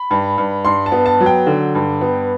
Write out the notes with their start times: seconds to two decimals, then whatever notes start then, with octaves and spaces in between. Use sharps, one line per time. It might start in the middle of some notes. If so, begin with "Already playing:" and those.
Already playing: B5
0.11 G2
0.38 G2
0.65 G2 C6
0.86 A5
0.92 B3
1.06 A5
1.20 F#3
1.26 G5
1.47 D3
1.75 G2
2.01 B3